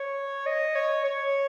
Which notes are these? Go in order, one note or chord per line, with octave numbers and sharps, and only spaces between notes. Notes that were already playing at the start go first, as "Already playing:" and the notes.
Already playing: C#5
D#5
C#5
C#5